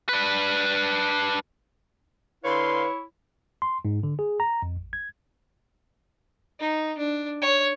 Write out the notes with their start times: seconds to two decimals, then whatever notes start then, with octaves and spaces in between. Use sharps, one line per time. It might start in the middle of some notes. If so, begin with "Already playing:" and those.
0.09 D4 B4
2.44 D3 E4 B4 C#5 F5 C6
3.62 C6
3.85 G#2
4.03 D3
4.19 G#4
4.40 A#5
4.62 F2
4.77 A1
4.93 G#6
6.59 D#4
6.98 D4
7.42 C#5